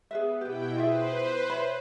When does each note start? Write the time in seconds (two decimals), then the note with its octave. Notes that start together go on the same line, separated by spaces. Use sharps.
0.11 B3 G#4 B4 E5
0.41 B2 E4 G4 B4 G5
0.76 F4 G#4 B4 C5 E5
1.50 C#5 E5 B5